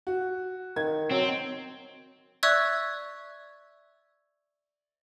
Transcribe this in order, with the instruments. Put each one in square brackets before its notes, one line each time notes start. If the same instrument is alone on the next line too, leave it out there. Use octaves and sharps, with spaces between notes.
[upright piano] F#4
[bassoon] D#3 [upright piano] G#6
[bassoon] F#3 [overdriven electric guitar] C4
[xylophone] D5 E5 C#6 E6 F#6 G#6